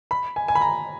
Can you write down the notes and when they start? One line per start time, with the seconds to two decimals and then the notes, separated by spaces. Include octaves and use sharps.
0.11 B5
0.36 G#5
0.48 G#5
0.55 B5
0.61 A#5